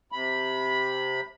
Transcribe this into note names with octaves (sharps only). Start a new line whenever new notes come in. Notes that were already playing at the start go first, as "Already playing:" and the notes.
C3 B5